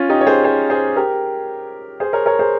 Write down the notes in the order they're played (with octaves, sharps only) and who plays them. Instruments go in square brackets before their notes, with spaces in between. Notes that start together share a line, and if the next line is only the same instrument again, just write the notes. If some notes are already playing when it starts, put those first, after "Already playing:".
Already playing: [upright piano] C#4 F4
D#4 G4
C#5
G#4 C5
G#4 C5
G#4 C5
G4 A#4
G#4 C5
A#4 C#5
A#4 C#5
G#4 C5